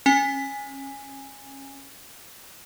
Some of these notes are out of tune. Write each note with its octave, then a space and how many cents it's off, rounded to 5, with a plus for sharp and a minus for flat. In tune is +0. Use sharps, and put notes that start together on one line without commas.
C#4 -30 G#5 -10